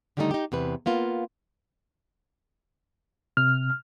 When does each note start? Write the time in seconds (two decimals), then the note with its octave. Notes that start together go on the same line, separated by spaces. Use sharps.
0.17 D3 D#3 G3 A3 B3 D#4
0.31 D#4 G4
0.52 E2 C3 B4
0.86 A#3 B3 F4
3.37 C3 F6